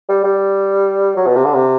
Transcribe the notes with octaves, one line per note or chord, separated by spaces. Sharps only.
G3
G3
F#3
B2
C3
D3
C3